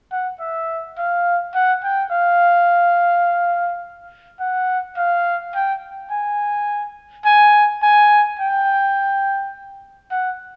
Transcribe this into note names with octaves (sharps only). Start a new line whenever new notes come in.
F#5
E5
F5
F#5
G5
F5
F#5
F5
G5
G#5
G#5
G#5
G5
F#5